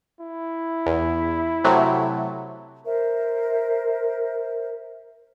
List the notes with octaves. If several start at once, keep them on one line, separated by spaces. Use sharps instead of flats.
E4
E2
C3 F#3 A3
A#4 C5 E5